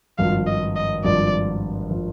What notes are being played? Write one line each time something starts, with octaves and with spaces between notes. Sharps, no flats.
G#1 G2 F3 F5
D#5
D#5
G#1 G2 F3 D5
F3